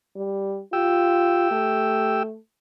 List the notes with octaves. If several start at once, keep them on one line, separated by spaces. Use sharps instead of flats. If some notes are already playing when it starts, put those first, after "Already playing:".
G3
F4 G4 G5 E6
A3